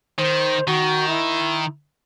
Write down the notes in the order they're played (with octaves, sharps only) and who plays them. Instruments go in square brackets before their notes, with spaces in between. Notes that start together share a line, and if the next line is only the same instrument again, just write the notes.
[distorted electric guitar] D#3 [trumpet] C5
[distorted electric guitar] D#3 [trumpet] F#4
[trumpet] E4